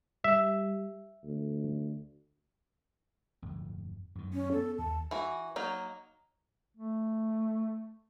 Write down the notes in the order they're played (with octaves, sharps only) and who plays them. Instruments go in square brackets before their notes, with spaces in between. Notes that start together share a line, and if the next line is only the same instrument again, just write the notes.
[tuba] G3 [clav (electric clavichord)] E5
[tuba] D2
[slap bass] D1 G1 F2
F#2 D#3
[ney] C#4
[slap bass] B3 [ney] A4
[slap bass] D#2 [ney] A5
[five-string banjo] E3 F#4
F#3 A#3 D#4
[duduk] A3